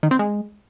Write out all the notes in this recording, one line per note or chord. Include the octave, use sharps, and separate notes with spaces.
D#3
C4
G#3